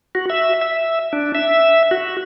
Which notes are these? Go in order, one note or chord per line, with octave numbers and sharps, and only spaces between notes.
F#4
E5
E5
D4
E5
F#4